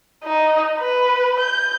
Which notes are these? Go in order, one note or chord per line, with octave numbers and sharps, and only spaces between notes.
D#4
B4
G6